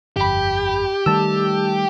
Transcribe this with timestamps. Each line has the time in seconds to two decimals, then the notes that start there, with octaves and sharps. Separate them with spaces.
0.16 G1 F2 G4 B5
1.06 D#3 G3 A3 A5 E6